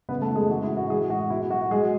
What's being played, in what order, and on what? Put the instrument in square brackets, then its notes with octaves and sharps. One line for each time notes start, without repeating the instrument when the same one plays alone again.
[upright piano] C#3 B3 B4
A3 A4
E3
G#3 G#4
E3 F#4
E4
A2
F#4
E3 G#3 G#4
A2 F#4
B2 E4
F#3 F#4
F#3 G#3 G#4